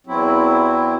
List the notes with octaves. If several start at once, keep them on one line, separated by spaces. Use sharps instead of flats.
E2 F#3 C4 E4